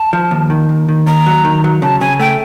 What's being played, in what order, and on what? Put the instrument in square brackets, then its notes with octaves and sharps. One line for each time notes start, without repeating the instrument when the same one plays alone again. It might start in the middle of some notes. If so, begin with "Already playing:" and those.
Already playing: [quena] A5
[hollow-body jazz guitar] F3
D#2
D#3
D#2
D#3
[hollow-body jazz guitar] D#2 [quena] A#5
[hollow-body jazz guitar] F#3
D#3
F#3
[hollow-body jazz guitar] C#3 [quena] A5
[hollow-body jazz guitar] C#3 [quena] G#5
[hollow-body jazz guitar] A3 [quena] G5